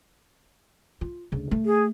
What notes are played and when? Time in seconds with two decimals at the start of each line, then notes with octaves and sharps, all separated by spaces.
1.01 F4
1.32 D2 C#3
1.51 A3
1.66 G#4